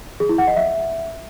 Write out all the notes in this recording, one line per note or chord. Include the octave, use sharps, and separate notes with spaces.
G#4
E4
F#5
D#5
E5